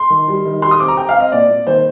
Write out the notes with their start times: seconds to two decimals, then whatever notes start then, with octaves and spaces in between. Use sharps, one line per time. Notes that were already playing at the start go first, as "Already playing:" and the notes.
Already playing: C6
0.10 D#3
0.28 G3
0.45 D#3
0.62 G3 C6
0.71 D#6
0.80 C4 D6
0.88 A#5
0.97 C4 G5
1.09 F5
1.15 C4
1.20 D#5
1.32 A#2 D5
1.50 A#2
1.67 D#3 C5